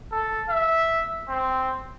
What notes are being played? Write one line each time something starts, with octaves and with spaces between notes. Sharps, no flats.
A4
E5
C4